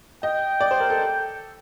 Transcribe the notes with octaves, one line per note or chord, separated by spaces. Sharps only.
D#5 G5
D5
C5
A#4
A4